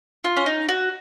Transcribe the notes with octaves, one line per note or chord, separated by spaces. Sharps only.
F4
C#4
D#4
F#4